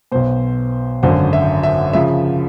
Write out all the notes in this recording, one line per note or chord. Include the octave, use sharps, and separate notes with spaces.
B1 B2 C5
G#1 F#2 D3 C5
E5
E5
C#3 F3 E5